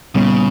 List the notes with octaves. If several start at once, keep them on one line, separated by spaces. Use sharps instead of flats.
A#2 C#3 G3 B3